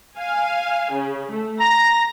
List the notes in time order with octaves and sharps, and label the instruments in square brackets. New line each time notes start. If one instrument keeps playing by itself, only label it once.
[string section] F5 G#5
C#3
A3
[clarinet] A#5 [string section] A#6